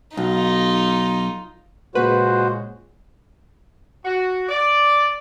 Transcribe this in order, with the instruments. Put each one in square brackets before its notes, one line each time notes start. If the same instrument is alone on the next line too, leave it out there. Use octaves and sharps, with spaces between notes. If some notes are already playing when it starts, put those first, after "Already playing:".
[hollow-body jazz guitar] B1 [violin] D#4 F4
[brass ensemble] A#2 C#3 G#3 [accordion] F#4 C5 [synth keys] B4
[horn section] F#4
D5